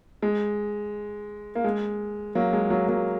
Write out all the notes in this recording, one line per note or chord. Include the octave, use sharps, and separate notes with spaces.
G#3
A#3
G#3
F#3 A#3
G#3
F#3 A#3
F#3 A#3